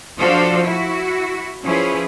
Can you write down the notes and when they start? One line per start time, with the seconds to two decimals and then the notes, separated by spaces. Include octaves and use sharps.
0.19 F3 D4 F#4 A4 C5 F5
0.65 E4 F#4
1.64 F3 C#4 E4 G#4 B4